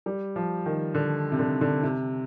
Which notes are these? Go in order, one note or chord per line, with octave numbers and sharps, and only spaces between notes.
G3
F3
D#3
D3
C3
D3
D3
C3